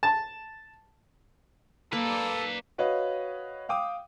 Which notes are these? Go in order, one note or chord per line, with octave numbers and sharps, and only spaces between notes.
A5
A#3 A4 B4 D5
F#4 B4 C#5 D#5 F5
F5 G5 D6 D#6